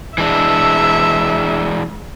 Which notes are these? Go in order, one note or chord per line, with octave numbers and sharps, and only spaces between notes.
E3 G#3 D4 E5